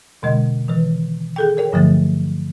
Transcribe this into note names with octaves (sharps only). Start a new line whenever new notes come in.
E2 B2 D3 G#3 D#5
D#3 E3 B4
G#4 A4 G5
A#4 C#5 G5
G2 D3 F3 F#3 A3 A6